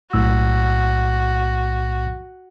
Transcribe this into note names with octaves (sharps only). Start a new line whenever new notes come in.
B1 A2 F#4 E6